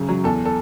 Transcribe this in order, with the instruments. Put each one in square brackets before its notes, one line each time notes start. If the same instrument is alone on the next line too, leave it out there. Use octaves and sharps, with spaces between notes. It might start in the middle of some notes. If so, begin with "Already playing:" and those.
Already playing: [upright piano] F#2 C#3
F#3
E2 A4
A4